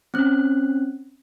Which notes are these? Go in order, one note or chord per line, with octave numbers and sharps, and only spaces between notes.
C4 C#4 F#6